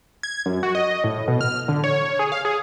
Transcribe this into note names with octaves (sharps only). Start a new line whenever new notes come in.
G#6
F#2
F#4
D#5
A2
B2
F6
D3
C#5
G#4
F5
G#4